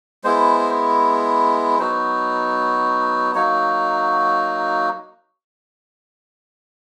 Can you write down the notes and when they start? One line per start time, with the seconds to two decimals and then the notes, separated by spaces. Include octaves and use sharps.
0.24 G#3 B3 E4 C5
1.79 F#3 B3 D#4 F#4 C5
3.35 F#3 A#3 D#4 F#4 C#5